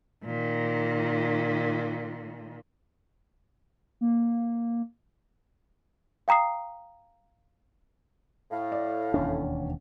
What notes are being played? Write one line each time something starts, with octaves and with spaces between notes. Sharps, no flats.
A#2 D#3
A#3
F5 G5 A#5 D#6 C7
A2 F5
D5
E1 D#2 C#4 D4